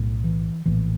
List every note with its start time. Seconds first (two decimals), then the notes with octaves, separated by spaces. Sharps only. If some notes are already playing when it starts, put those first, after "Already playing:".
Already playing: B1 A2
0.24 E3
0.66 A#1 A2 E3